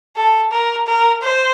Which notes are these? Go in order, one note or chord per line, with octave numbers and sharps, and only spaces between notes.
A4
A#4
A#4
C5